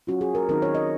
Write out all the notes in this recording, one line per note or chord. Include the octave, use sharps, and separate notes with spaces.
F#3 C#4 F4 F#4
G#4
A#4
D#3 F#3 C4 D#4 A#4
C#5
D#5